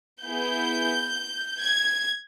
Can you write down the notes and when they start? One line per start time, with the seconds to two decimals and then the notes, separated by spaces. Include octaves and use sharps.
0.24 B3 E4 G#4 G6
1.60 G#6